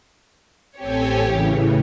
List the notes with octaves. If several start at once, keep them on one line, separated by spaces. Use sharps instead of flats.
A1 C4 G4 A4 C#5 G#5
A2 C#3 E3